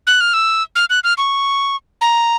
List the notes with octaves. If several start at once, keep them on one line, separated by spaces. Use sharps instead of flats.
F#6
F6
E6
F6
F#6
F6
C#6
A#5